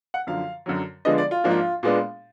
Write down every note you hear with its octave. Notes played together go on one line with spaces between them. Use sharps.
F#5
F#2 D3 F3 F5
F#2 D3 F#3
D3 F3 G#3 B3 D4 D#5
D5
F4
G#2 F3 A#3 D4
F4
A#2 G#3 B3 D4